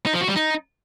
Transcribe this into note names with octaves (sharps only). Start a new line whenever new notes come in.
D#4
F3
F#4
G3
D#4